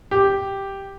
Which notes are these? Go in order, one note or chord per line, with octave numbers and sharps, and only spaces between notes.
G4